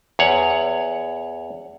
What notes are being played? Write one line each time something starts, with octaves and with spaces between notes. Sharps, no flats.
E2 C#5 F#5